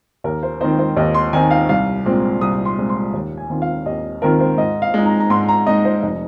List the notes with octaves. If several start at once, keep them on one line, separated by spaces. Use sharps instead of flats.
D#2 A#4
C5
D#3 C4 D#4 C5
C5
D#2 D#5
C6
D#3 C4 D#4 G#5
F5
C2 F5
A#2 G#3 C4
C2 D#6
C6
A#2 G#3 C4
C6
D#2
G#5
D#3 C4 F4
F5
D#2 D#5
D#3 C4 F4 A#4
C5
G#2 D#5
F5
G#3 D#4
A#5
A#5
G#2 C6
A#5
G#3 D#4 D#5
C5
F1 D#5